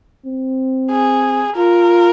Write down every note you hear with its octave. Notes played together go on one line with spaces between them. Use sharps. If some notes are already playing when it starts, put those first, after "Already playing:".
C4
G#4
F4 A#4